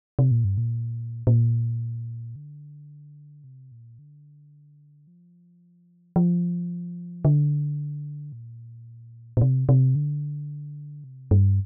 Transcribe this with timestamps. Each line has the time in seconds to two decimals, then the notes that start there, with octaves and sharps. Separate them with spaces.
0.19 C3
0.31 A#2
0.44 G2
0.58 A#2
1.27 A#2
2.36 D3
3.44 C3
3.72 A#2
3.99 D3
5.07 F3
6.16 F3
7.25 D3
8.32 A#2
9.37 A#2
9.41 C3
9.69 C3
9.95 D3
11.04 C3
11.31 G2